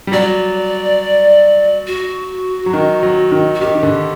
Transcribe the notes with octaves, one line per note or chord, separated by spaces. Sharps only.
G3
F#3 D5
F#4
F#3
D#3
F#3
D#3
F#4
D#3 G4
D#3
D3